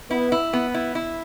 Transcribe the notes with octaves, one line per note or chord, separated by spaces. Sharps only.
B3 E4
E4
B3
E4
E4